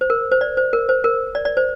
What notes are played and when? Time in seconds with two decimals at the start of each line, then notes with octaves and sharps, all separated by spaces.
0.01 C5
0.10 A#4
0.32 C5
0.41 D5
0.57 C5
0.73 A#4
0.89 C5
1.04 A#4
1.35 D5
1.45 D5
1.57 C5